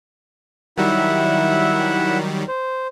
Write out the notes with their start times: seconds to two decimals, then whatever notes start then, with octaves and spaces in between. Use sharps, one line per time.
0.77 D#3 F#3 G3 E4 E5 F#5
2.48 C5